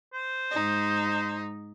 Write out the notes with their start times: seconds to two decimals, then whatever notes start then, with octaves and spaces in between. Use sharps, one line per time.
0.14 C5
0.51 G#2 D#4